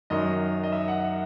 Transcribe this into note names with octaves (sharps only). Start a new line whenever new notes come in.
F#2 D#3 F#3 D#5
D#5
E5
F#5